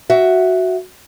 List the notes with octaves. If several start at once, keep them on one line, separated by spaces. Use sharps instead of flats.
F#4 E5